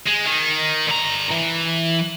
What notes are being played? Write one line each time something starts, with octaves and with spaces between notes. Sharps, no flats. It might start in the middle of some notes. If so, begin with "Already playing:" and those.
G#3
D#3
D3 A#5
E3